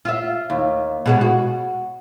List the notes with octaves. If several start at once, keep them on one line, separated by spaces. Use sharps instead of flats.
F4 E5
D#2
B2 G#3 F#4
F#4